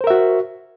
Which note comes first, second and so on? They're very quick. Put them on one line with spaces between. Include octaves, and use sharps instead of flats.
C5 A#4 E5 F#4